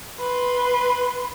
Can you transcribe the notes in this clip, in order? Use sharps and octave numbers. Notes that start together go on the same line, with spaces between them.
B4 C6